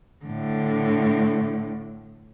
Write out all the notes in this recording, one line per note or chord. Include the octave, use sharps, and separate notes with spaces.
A2 D3